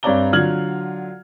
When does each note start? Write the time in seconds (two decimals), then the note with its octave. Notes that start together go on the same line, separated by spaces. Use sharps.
0.03 G2 C4 C#5 D5 A#5 G7
0.33 D3 F#3 F4 F6 G#6 F#7